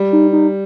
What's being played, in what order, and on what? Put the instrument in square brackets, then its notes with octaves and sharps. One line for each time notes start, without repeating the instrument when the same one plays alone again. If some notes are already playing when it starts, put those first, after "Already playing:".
Already playing: [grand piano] G3
[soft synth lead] D#4
D#4